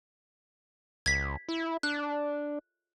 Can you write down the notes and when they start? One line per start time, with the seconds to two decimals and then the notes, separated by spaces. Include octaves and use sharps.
1.06 C#2 G#6 B6
1.48 E4
1.83 D4 F#6